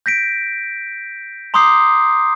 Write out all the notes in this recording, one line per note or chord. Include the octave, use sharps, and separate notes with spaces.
G6 A#6 B6 D7
A#5 C6 D6 D#6 G6 C7